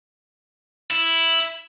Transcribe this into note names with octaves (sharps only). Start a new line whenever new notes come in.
E4